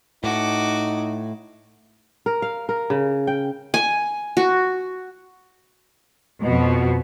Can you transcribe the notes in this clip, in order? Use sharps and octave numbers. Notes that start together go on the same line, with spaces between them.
A2 D#4 F#4 D6
A#4
F5
A#4
C#3
G5
G#5
F#4
F2 B2